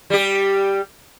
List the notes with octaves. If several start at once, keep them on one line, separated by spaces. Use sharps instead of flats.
G3 G4